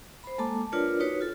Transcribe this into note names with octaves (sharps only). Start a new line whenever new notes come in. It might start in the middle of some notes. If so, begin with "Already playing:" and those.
C5 B5
G#3 A#3 A4 A5 D6
D4 F4 A#4 B4 C#5 D5
D#4 F#4 B4 C#5
F4 A4